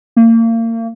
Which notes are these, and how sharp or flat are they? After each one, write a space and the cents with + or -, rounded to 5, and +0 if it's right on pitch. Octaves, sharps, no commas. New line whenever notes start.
A#3 -35